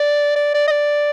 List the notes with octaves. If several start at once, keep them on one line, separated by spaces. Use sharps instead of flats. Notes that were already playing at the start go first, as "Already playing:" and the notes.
Already playing: D5
D5
D5
D#5
D5